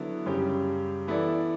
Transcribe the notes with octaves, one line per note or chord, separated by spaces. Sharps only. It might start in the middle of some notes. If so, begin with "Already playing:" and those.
Already playing: D3 F#3 B3 E4
F#2 C#3 G3 C#4 G4
E3 B3 E4 A4 D5